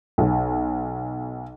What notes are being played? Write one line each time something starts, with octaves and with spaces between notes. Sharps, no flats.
B1